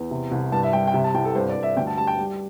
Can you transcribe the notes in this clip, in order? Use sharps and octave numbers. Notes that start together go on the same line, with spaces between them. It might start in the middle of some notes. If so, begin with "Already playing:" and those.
Already playing: E2
C3
C2
G2 A5
E5
G3 G5
G5
C3 E5
A5
C2 G5
A4
G2 C5
D5
G2
E5
D2 G5
A5
G3 A5
G5
G3